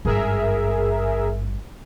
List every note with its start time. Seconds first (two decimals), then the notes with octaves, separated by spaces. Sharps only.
0.05 G#1 G2 G#4 A#4 E5